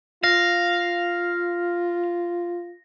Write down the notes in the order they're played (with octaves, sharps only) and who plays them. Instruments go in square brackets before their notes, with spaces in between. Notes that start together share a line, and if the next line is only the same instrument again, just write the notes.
[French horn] F4 [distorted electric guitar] F5 [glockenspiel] A#6